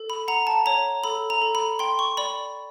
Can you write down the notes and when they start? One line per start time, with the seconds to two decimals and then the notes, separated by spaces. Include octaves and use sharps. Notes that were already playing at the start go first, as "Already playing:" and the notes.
Already playing: A4
0.10 B5
0.28 F#5 A#5
0.47 A5
0.66 C#5 A#5
1.04 A4 B5
1.30 A#5
1.42 A4
1.55 B5
1.79 G5 C6
1.99 C#6
2.17 D5 B5